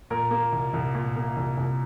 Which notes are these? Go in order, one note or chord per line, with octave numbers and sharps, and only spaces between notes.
A#2 A#4
A#3
C2
C2
A#2
A#3
C2
C2